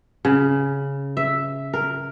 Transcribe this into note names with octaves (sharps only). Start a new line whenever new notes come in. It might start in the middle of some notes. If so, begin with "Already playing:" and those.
C#3
E5
A#4